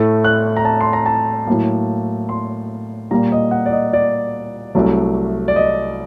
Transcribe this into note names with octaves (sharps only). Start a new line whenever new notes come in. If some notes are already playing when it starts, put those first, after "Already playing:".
Already playing: A2 A3
F#6
A#5
A5
C6
A#5
A5
A2 F#3 A#3
C6
A#2 G3 A#3 A#5
D#5
F#5
D5
D#5
D5
C2 C3 F#3 A3
D5
D#5